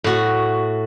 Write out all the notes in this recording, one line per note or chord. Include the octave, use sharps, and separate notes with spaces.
A2 F#4